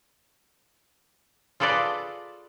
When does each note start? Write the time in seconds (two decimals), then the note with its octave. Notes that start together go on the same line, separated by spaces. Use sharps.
1.60 F4 G#4 A4 B4 D5 D#5